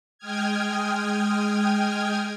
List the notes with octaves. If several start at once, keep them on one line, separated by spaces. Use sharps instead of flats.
G#3 G5 D#6 F6 G#6